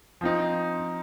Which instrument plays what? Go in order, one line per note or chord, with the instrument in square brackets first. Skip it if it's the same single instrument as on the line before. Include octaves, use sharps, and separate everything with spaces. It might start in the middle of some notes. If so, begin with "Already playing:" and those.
[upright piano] F3 C4 D#4